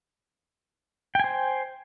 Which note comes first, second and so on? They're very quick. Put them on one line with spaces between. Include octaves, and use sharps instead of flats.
G5 G#5 C5